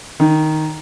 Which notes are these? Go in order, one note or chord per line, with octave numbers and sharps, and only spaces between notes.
D#3